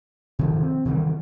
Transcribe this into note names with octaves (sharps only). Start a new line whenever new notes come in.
C3 D#3 F3
C4
C3 D#3 E3 G3